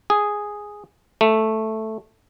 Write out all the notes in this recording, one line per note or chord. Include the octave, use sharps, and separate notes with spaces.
G#4
A3